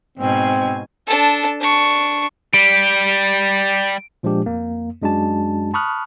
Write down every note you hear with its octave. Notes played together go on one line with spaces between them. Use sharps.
G#2 B2 C4 G#5
D4 A4
D4 C#6
G3 D7
A#2 F3 G#3 D4 G4
F2 A#3
F#2 G#3 D4 F#4 A5
A5 B5 C#6 D#6 F6 F#6